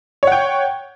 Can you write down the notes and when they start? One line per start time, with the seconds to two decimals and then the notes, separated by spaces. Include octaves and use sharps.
0.23 C#5
0.27 F#5
0.32 G5